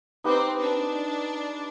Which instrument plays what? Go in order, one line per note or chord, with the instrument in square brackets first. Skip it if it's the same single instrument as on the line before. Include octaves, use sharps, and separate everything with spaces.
[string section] C4 [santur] D#4 G4 B4
[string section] D4